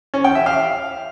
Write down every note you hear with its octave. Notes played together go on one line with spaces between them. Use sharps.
C#4
G5
E5
F5